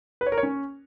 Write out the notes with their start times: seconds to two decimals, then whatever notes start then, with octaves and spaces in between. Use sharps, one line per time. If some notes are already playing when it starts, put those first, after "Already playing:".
0.21 B4
0.27 C#5
0.32 A#4
0.38 C#5
0.43 C#4